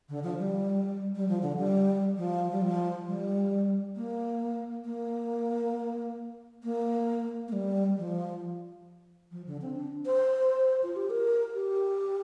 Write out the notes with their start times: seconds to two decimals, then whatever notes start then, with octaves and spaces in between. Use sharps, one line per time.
0.09 D3
0.23 F3
0.39 G3
1.16 G3
1.28 F3
1.42 D3
1.58 G3
2.17 F3
2.52 G3
2.62 F3
3.06 G3
3.96 A#3
4.85 A#3
6.63 A#3
7.48 A#3
7.53 G3
7.98 F3
9.32 F3
9.47 D3
9.61 C4
9.75 D4
10.06 C5
10.83 F4
10.96 G4
11.10 A#4
11.54 G4